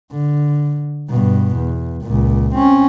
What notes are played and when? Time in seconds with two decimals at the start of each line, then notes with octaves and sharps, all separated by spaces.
0.12 D3
1.09 G2 B2
1.56 E2
2.02 C#2 A#2
2.55 C4 C#4